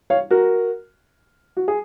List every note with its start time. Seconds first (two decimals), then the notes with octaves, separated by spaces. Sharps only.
0.10 C#5 F5
0.31 F#4 A#4
1.57 F#4
1.68 G#4